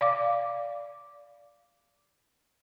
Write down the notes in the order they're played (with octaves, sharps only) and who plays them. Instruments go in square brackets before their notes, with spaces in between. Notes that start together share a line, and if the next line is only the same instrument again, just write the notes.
[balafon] D5 F5 D6